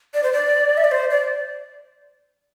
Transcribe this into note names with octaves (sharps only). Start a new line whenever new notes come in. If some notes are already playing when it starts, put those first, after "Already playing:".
D5
C5
D5
E5
D5
C5
D5